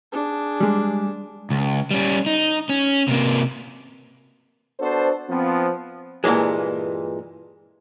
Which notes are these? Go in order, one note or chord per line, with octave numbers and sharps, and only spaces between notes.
D4 G#4
G3 G#3
C#2
G3 C#4
D#4
C#4
C3 A#3
B3 D4 F#4 A4 C5
F3 B3 C4
G2 A#2 C#3 E3 G#3